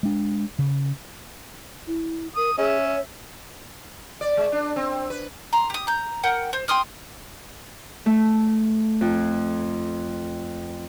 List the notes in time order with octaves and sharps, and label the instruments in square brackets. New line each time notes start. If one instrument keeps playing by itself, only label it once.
[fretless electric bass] G#3 D4
C#3
[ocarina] E4
[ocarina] A#4 [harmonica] D#6
[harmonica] C#4 [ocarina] G#4 [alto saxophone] E5
[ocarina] C#5
[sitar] D5
G#3
D4
C4
B4
[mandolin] A#5 C6
G4 D#6
A#5 G6
A#4 F#5 G5
C5
G5 C6 D#6 F6
[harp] A3
F2